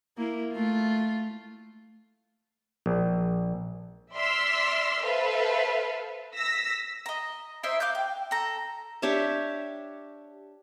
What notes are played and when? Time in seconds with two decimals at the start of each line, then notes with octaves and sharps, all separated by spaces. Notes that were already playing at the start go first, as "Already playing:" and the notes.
0.18 A#3 E4
0.53 A3 F4
2.86 A#1
4.14 D5 E5 C6 E6 F6 B6
5.03 A4 B4 C5 E5 F5
6.36 E6 A#6 B6
7.06 D#5 A#5
7.63 E4 C5 D#5 E5
7.80 F5 D6 F#6 G6
7.95 G5
8.31 A4 A#5
9.02 D4 G4 C#5 E5